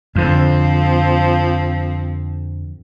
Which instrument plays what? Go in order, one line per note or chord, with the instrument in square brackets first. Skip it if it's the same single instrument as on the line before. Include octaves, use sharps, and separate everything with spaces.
[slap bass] F2 D3 [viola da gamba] F3 C4